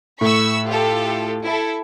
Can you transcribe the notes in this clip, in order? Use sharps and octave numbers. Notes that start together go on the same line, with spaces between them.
A2 B5 C#6 E6
F4 G4 A4
E4 A4